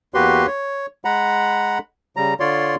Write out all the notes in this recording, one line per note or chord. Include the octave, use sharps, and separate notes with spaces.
E2 A#3 F#4 G4 B4 C6
C#5
G#3 F#5 A#5 B5
C#3 G3 A#5
D3 F4 C#5 D5 C6